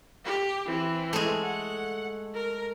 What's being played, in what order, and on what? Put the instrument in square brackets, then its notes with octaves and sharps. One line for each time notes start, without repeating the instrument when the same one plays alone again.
[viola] G4
E3 C4
[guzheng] G#3 A3
[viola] F#5
A#4